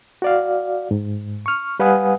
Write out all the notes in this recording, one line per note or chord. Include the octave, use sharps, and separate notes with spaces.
F#4 D5 F5
G#2
C#6 F6
G3 B4 F5 F#5 G#5 D#6